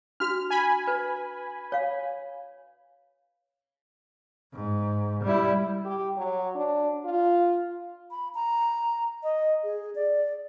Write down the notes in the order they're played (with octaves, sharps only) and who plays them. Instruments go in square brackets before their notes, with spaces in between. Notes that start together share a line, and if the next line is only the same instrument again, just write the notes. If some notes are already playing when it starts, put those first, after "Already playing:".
[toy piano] D4 F#4 [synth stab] F6
[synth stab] G#5 B5
[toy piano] B4
C#5 F5
[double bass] G#2
G3 E4
[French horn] G4
F#3
D4
F4
[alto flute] B5
A#5
D#5
G#4
D5